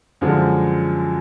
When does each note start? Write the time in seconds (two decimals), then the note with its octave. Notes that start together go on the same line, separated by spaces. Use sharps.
0.21 F#2 D3 F3 G#3